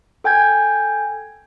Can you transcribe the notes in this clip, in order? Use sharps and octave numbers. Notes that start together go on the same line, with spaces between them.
A4 G5 G#5 G6 G#6